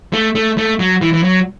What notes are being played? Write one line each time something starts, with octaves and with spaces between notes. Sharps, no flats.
A3
A3
A3
F#3
E3
E3
F#3